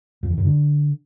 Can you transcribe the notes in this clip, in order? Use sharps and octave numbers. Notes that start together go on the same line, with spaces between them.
F2
E3
F#2
D3